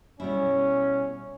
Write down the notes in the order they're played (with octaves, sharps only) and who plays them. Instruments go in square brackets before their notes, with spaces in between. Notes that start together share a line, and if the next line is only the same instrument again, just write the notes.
[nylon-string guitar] B2 G3 E4 [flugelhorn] C#4